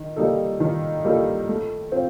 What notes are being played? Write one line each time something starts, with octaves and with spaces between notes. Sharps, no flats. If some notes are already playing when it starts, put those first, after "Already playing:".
Already playing: D#3
G3 A#3 D#4 A4
D#3
G3 A#3 D#4 A4
A3
C4 F4